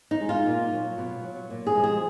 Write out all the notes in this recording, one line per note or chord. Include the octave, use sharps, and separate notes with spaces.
D#4
G#3
F4
A#2
F#3
B2
F#3
A#2
G#4
F3 G#3
G#4